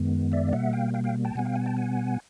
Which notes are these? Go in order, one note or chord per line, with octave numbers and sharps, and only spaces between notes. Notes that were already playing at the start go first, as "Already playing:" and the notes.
Already playing: F#2 D#3 G#3 B3
D5 E5
B2 G3 A#3 E5 F#5
F5 G5
F5 G5
F5 G5
G5 A5
B2 G3 B3 F#5 G#5
F5 G5
F#5 G#5
G5 A5
F#5 G#5